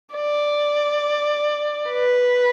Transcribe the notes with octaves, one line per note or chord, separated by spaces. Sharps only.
D5
B4